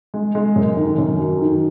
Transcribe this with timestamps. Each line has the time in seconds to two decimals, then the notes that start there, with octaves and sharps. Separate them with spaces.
0.14 G#3
0.35 G#3
0.56 F#2
0.77 D#3
0.98 F#2
1.19 F#3
1.40 D#3